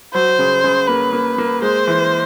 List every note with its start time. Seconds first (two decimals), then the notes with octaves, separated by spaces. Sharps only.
0.14 F#3 C5
0.39 C#3
0.64 C#3
0.88 A#3 B4
1.13 A#3
1.38 A#3
1.62 G#3 C5
1.87 E3